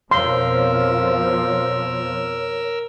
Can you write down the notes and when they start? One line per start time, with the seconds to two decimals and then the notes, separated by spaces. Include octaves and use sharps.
0.11 F2 B2 F3 A#4 C#5 C6 E6